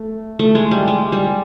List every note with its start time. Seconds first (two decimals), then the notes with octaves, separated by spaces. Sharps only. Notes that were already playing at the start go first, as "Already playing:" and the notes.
Already playing: A3
0.39 A3
0.55 G#3
0.71 G3
0.88 G#3
1.12 G3